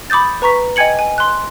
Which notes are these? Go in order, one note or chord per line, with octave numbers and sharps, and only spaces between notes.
B5 D6 D#6 G6 A6
B4 A#5 C#6 B6
D#5 G5 G#5 G#6 C#7 F#7
G#5
C6 F#6